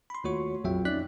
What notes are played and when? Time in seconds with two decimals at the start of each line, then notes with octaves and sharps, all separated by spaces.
0.10 B5 C6
0.24 D#2 A3 F4 F#4 C#5 C#6
0.64 A#1 F2 F#3 F4 E5 G5
0.85 C#4 D#4 D5 F#6 B6